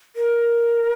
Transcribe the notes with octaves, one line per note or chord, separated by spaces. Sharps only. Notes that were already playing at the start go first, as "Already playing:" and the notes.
A#4